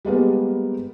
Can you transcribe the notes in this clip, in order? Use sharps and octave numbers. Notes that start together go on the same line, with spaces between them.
G3 G#3 A#3 B3